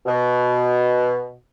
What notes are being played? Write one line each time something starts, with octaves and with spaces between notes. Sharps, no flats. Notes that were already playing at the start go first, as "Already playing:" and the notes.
B2